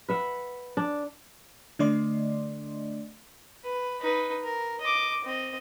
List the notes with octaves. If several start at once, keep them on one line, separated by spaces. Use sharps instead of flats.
B4 E5 F#5
D4
D3 A3 D4 D5 D#5 C6
B4
D#4 B4
A#4
D#5 D6
C4 D#5